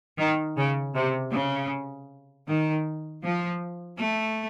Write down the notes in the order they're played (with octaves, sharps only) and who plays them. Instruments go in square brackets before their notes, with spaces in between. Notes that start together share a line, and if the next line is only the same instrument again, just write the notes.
[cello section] D#3
C#3
C3
C#3
D#3
F3
A3